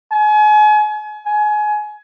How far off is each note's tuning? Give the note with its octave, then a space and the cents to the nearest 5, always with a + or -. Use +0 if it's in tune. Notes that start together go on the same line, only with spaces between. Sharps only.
G#5 +35
G#5 +25